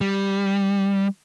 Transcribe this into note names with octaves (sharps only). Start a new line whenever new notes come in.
G3